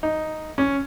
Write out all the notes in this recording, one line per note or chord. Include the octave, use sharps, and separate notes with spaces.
D#4
C#4